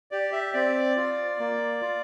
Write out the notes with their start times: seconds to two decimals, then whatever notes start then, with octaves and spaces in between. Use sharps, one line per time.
0.11 G4 D5
0.32 E5
0.53 C4 D5
0.96 F4
1.39 A#3
1.81 F4